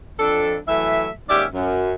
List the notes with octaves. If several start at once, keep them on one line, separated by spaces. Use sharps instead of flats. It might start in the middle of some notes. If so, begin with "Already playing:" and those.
F2 D4 A4
E3 F#3 A3 E5
D#2 G#2 C#4 G4 D5 E5
F#2